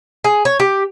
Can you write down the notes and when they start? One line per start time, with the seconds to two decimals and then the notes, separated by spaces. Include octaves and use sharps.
0.24 G#4
0.45 C#5
0.60 G4